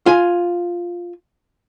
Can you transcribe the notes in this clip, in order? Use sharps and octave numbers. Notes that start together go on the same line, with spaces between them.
F4 G#5